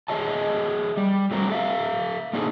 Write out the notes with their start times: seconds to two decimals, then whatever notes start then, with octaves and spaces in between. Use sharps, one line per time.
0.08 G#4 C#5 D#5 E5 A5
0.97 G3
1.31 F#3 G3 A3 C4 F#4 A#4
1.50 A4 E5 F5
2.33 A#3 C4 D4 D#4 G#4